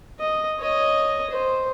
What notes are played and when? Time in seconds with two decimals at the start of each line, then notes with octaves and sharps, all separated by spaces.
0.19 D#5
0.59 C#5 D#5
1.30 C5